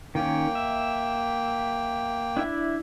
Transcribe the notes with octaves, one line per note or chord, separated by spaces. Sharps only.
D#3 A#3 C#4 G5
E5
D4 E4 E5